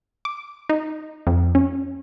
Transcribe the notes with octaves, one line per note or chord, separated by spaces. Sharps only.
D6
D#4
F2
C#4